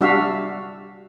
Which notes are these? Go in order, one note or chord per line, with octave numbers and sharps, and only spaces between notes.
G3 D4 F#4 E5 F5